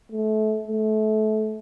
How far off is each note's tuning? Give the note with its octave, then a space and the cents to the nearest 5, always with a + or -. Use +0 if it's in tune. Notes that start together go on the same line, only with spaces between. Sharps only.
A3 -25
A3 -25